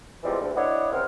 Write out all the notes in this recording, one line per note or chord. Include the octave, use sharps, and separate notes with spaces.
E3 F3 G3 G#3 B3 C4
D2
D4 E4 C#5 D#5 F#5
C#2 C4 F6